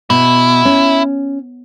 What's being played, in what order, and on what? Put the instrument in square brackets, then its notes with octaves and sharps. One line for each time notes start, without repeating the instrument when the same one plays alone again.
[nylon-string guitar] B2 [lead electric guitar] E4
[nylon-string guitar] C#4